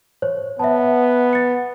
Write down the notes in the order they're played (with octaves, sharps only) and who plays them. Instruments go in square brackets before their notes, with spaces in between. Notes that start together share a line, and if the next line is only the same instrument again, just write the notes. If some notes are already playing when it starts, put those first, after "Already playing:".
[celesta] C5 C#5
[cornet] B3 [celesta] E5 A5
[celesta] A6 C#7